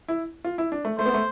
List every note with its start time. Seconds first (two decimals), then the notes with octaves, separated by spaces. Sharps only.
0.08 E4
0.44 F4
0.58 E4
0.72 D4
0.85 A3
0.98 A3 C5
1.06 B3
1.14 A3